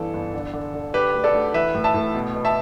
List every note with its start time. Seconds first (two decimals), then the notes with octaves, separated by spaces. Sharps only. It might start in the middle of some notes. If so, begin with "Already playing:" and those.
Already playing: G1 E3 A4
0.13 G1
0.34 D3
0.53 D3
0.74 D3
0.94 D3 G4 B4
1.14 D2
1.24 A4 D5
1.34 D2
1.54 E3 B4 E5
1.74 A2
1.84 E5 A5
1.94 A2
2.15 B2
2.35 B2
2.45 E5 A5